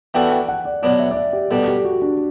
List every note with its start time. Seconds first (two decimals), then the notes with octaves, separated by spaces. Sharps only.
0.14 E3 B3 D4 F#4 A4 G5
0.31 G5
0.48 F#5
0.65 D5
0.82 B2 F#3 B3 D4 D5
0.99 E5
1.11 D5
1.17 E5
1.33 G4
1.50 B2 G3 D4 A4
1.68 G4
1.85 F#4
2.02 D4